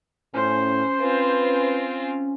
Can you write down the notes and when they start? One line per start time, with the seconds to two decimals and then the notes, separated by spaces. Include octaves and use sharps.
0.34 A2 C#4 C5
1.00 C4 F4 B4